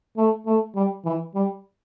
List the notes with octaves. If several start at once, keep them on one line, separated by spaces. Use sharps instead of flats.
A3
A3
G3
E3
G3